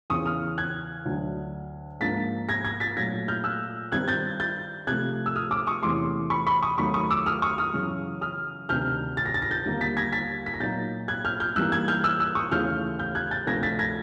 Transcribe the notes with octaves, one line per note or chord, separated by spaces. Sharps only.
E2 C#3 E3 C#6 D#6
D#6 F6
F#6 G#6
D2 D3 F#3
G#2 F3 A#3 D4 A6 B6
G#6 A#6
G#6 A#6
A6 B6
A#2 F#3 A3 G#6 A#6
F6 G6
E6 F#6
G2 D#3 G3 C4 F#6 G#6
G6 A6
G6 A6
C3 F3 A3 F#6 G#6
E6
D#6 F6
D6 E6
C#6 D#6
E2 C3 E3 A3 C#4 C6 D6
B5 C#6
B5 C#6
C#6 D#6
D#2 D#3 F#3 A3 B5 C#6
C#6 D#6
D6 E6
D#6 F6
C#6 D#6
D#6 F6
F#2 C#3 E3
D#6 F6
D2 C3 D#3 F6 G6
A6
A#6
A6
A#6
G6 A6
D#2 D3 G3 A#3
A6 B6
G#6 A#6
A6 B6
B6
A#6
A#2 F#3 A#3 D#4 G6 A6
F#6 G#6
F6 G6
F6 G6
G2 E3 G3 A#3 D#4 E6 F#6
F#6 G#6
F6 G6
E6 F#6
E6 F#6
C#6 D#6
D#2 C#3 E3 A3 F6 G6
F6 G6
F#6 G#6
G6 A6
D2 C3 F3 A3 G#6 A#6
A6 B6
G#6 A#6